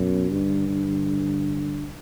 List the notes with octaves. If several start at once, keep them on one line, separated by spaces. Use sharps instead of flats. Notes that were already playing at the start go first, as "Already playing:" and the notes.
Already playing: F#2 B2
G2 D3
D3